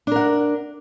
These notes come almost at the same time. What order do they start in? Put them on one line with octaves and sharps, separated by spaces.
D4 A#4 F#5